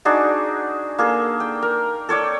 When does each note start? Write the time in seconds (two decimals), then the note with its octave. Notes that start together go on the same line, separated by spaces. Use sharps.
0.05 D4 D#4 F#4 G#4
0.98 A#3 G#4 A4
1.40 G5
1.62 A#4
2.09 A4 C#5 D5 G5